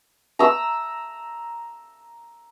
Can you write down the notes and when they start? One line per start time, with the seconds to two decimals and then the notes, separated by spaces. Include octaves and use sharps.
0.39 A#5 E6